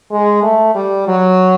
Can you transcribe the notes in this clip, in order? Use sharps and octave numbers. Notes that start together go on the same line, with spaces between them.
G#3
A3
G3
F#3